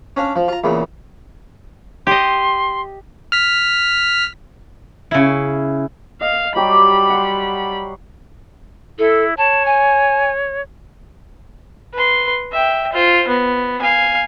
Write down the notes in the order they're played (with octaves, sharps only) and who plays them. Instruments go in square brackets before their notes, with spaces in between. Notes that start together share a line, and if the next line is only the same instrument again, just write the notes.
[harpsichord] C#4 D4 F5
F3
F4 A#5
E2 A#2 C#3
[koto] G4 D#5 [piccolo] C6
[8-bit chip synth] F6 B6
[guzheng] C#3 E4
[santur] D#5 [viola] F5
[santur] F#3 G4 D6 [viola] G3 B5
[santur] F#5 C6
[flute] E4 [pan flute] A4
[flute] C#5 [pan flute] A5
[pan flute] G#5
[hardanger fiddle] B4 C6
E5 G5
F4 C5
B3
F5 G#5